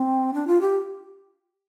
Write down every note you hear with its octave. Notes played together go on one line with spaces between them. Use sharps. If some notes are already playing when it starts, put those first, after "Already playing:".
Already playing: C4
D4
F4
G4